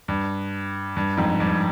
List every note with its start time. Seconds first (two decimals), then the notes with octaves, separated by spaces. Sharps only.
0.08 G2
0.97 G2
1.17 F2 G#2
1.40 G2